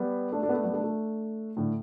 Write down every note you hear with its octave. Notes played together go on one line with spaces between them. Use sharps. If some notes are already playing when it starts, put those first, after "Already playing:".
Already playing: G3 B3
A3 D4
A3 D4
B3
A3 D4
G3 B3
A3 D4
A3 D4
A2 D3